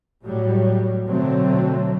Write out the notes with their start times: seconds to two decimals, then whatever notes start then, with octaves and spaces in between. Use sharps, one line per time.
0.25 A2 F#3 G3
1.07 B2 D3 F#3 A3 C4